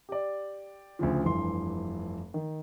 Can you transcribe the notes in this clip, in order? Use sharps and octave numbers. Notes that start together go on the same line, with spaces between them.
G4 D5
D2 C#3 F3
F1 G2 E3 C6
D#3